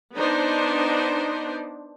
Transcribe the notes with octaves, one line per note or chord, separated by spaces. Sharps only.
B3 D4 D#4 C5